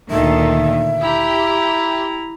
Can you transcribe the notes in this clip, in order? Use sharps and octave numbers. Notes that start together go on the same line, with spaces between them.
D2 A#2 D#3 A4 E5
E4 G4 A#5